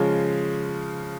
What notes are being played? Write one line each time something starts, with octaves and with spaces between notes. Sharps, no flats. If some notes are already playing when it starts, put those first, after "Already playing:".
Already playing: C#3 F3 G#3